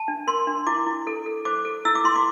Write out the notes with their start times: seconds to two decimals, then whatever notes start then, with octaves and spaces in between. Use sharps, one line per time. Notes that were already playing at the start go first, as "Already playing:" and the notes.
Already playing: A5
0.08 D4
0.27 A#4 C6
0.47 D4
0.67 E4 D6
0.87 E4
1.07 A4
1.26 A4
1.45 C5 D6
1.65 A4
1.85 E4 E6
1.95 D6
2.04 E4 C6
2.16 D6